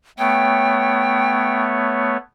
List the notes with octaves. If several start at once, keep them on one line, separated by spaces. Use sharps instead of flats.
A3 B3 C#5 G5